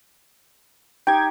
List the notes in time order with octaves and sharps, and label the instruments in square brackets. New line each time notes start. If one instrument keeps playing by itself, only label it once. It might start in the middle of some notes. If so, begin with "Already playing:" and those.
[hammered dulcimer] D#4 G4 D#5 [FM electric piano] G5 G#6